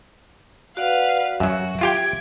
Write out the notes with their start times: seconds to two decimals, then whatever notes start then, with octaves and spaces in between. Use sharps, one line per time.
0.77 F#4 B4 D5 F5 F#5
1.40 F#2 F#3 F#4 E5
1.81 F4 G4 G5 G#6 D7